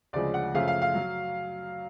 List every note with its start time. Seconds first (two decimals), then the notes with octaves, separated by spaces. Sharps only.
0.13 D2 C#3 F3 G#3 D5
0.34 F#5
0.54 F#2 C#3 F3 A3 F5
0.68 F5
0.82 F5
0.95 F#3